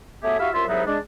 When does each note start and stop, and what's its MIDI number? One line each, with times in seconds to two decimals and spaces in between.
0.23 0.37 54
0.23 0.37 57
0.23 0.37 59
0.23 0.37 67
0.23 0.37 68
0.23 0.37 76
0.39 0.49 64
0.39 0.49 66
0.39 0.49 67
0.39 0.49 76
0.39 0.49 77
0.53 0.68 36
0.53 0.68 42
0.53 0.68 65
0.53 0.68 76
0.53 0.68 84
0.68 0.86 36
0.68 0.86 44
0.68 0.86 54
0.68 0.86 59
0.68 0.86 63
0.68 0.86 76
0.86 0.98 56
0.86 0.98 62